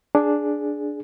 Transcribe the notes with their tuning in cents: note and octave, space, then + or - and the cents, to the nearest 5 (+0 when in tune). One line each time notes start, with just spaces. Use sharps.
D4 +0 G#4 +10